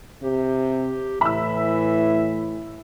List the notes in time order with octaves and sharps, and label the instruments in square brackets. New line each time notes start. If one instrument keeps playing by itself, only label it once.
[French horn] C3 [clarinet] G4
[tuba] A2 [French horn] E3 [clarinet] E5 [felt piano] B5 E6